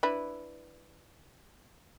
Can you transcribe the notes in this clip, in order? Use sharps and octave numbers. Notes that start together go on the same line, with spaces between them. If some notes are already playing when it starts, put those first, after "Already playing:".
D4 E4 B4